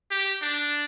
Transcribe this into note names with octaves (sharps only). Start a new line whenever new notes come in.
G4
D4